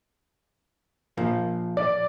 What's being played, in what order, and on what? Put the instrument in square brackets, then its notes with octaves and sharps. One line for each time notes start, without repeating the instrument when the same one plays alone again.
[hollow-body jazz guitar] A#2 F3 A#3
[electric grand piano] D5